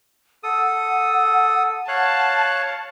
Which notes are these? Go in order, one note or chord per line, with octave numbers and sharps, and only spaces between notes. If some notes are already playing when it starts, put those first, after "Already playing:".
A4 F#5 D#6
C#5 F5 A5 F#6